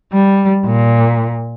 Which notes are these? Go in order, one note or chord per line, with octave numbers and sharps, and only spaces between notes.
G3
A#2